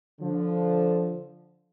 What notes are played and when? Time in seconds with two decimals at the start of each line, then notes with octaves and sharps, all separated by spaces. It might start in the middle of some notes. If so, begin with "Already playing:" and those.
0.21 D3 F3